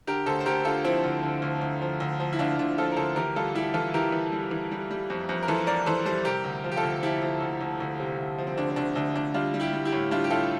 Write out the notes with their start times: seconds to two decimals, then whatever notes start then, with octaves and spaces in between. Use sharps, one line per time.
0.07 D3 G4 A#4
0.26 D2 A4 C5
0.40 C5
0.46 D2 G4 A#4
0.65 D3 F4 A4
0.84 F3 C4 E4
1.04 D2
1.23 D3
1.42 D2
1.61 D2
1.82 F3
2.00 D2
2.20 F3
2.33 E4
2.39 D2 D4 F4
2.58 D2 D4 F4
2.78 F3 F4 A4
2.92 A#4
2.97 D2 A4 C5
3.16 E3 G4 A#4
3.36 G3 F4 A4
3.55 G3 E4 G4
3.74 E3 F4 A4
3.94 E3 G4 A#4
4.12 E3
4.32 G3
4.51 E3
4.71 G3
4.91 G3
5.10 F2
5.29 F2
5.43 A#4
5.48 E3 A4 C5
5.67 F2 A#4 D5
5.86 E3 A4 C5
6.05 G3 A4 C5
6.25 C3 G4 A#4
6.44 D2
6.64 F3
6.72 G4
6.76 F4 A4
6.83 D2
7.03 F3 E4 G4
7.22 F3
7.41 D2
7.61 D2
7.80 D2
8.00 C3
8.18 D2
8.38 F3
8.47 C4
8.57 D2 D4
8.70 C4
8.76 D2 D4
8.95 D2 D4
9.15 D2 D4
9.34 G3 D4 F4
9.54 G3
9.60 E4 G4
9.73 G3
9.85 E4 G4
9.93 A2
10.11 G3 D4 F4
10.24 G4
10.30 A2 F4 A4